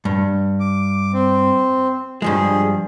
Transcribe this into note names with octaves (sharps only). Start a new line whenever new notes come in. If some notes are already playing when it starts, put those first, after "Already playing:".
G2
D6
C4
G2 F3 G#3 G#4